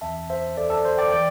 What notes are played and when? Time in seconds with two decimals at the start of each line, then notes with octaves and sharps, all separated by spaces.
0.01 E2 E3 C4 E5 A5
0.30 C5 E5
0.57 A4 D5
0.70 A4 D5
0.85 C5
0.98 D5 G5
1.11 E3 D5 G5